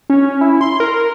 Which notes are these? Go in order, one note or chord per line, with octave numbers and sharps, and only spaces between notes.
C#4
E4
C6
A#4